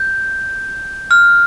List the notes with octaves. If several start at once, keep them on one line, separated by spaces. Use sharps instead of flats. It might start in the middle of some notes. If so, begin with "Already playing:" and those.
Already playing: G6
F6